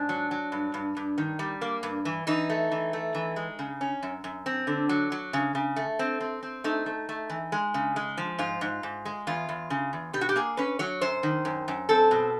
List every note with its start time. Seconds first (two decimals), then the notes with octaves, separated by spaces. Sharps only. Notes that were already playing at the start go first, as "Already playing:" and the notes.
Already playing: G#2 D4
0.09 F#3
0.31 F#3
0.52 G2
0.74 G2
0.97 G2
1.18 D#3
1.39 G3
1.61 A#3
1.83 G2
2.05 E3
2.27 E3 D#4
2.50 A3
2.71 E3
2.93 A3
3.15 E3
3.36 G#3
3.59 C#3
3.81 C#4
4.03 F#2
4.24 F#2
4.46 C4
4.67 D3
4.89 F#3
5.12 F#3
5.33 C#3
5.55 C#3
5.76 A3
5.99 C4
6.21 C4
6.43 C4
6.64 A3 D#4
6.86 A3
7.09 A3
7.30 E3
7.52 G#3
7.74 C#3
7.96 G#3
8.18 F3
8.38 G#2 F4
8.61 G#2
8.83 G#2
9.05 G#3
9.27 E2 F4
9.49 E2
9.70 C#3
9.93 E2
10.13 B2 G4
10.21 F#4
10.29 G4
10.36 A#3 G#4
10.57 C#4 B4
10.79 F#3 C#5
11.01 F#2 C5
11.23 D#3
11.45 F#2
11.68 F#2
11.89 C4 A4
12.11 B2